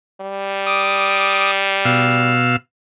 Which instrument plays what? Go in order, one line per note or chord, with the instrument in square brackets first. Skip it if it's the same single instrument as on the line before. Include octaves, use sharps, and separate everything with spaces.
[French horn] G3
[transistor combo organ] D6 D#6
B2 F5 E6